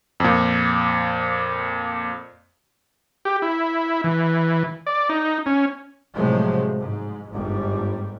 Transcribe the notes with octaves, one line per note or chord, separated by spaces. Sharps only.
F2 A#2
G4
E4
E3
D5
D#4
C#4
A2 C3 F3 F#3 G#3 A3
G#2
G1 G#2 G3